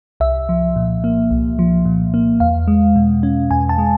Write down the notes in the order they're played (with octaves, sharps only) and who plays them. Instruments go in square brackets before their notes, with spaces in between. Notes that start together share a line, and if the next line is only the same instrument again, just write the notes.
[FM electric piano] C2 E5
F3
A#2
A#3
C2
F3
A#2
A#3
E2 F5
G#3
B2
C#4
E2 G#5
A5
G#3